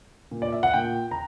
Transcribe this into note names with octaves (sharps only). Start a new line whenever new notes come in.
A#2
D5
E5
F#5
A#2 G5
A#5